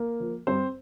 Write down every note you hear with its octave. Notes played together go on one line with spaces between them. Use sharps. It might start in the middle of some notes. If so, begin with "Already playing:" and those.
Already playing: A#3 A#4
F3
G2 C4 C5